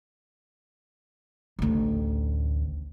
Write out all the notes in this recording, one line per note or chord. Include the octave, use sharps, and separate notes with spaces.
A1 D2